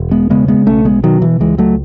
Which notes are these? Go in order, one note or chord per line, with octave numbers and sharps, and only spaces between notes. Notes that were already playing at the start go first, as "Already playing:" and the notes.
Already playing: E1
G#3 B3
C#3 G#3 B3
G#3 B3
B1 A3 C#4
G#3 B3
B2 D#3 F#3
E3
C#2 E3 G#3
F#3 A3